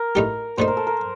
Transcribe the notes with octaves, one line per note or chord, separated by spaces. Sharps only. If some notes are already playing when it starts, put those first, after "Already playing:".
Already playing: A#4
A2 A3 D#4 G4
A#2 A3 D#4 C5
A#4
A4
A#4